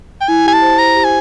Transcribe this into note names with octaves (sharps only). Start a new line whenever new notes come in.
G5
E4 G#5
G4 G#5
A5
C5
C5 A#5
G4
G#5